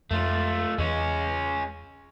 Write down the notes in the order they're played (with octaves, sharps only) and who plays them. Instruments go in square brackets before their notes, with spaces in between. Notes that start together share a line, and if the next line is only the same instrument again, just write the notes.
[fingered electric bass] F2 G#3 [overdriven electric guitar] A3 F4
[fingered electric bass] E2 E3 [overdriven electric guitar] G#3 C#4